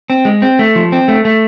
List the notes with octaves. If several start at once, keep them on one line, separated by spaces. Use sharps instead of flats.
C4
G#3
C4
A3
F3
C4
A3
A3